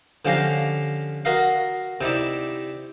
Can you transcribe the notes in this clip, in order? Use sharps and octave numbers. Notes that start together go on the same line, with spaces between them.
D3 F3 C#4 G4 F5 A#5
F#4 A#4 D#5 F5
C3 D#4 E4 D5